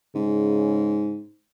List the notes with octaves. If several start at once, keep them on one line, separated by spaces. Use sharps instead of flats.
G#2 C#3